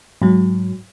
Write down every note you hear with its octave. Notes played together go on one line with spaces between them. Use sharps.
G#2 F#3